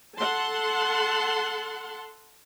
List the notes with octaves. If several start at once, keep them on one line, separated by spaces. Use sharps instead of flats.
A4 F#5 A5 C6